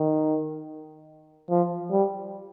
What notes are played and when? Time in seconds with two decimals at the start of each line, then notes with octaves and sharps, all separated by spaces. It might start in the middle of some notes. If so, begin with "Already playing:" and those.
Already playing: D#3
1.50 F3
1.91 G3